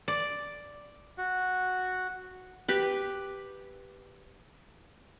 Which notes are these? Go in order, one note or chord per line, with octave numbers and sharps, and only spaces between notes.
D5
F#4
G4 B4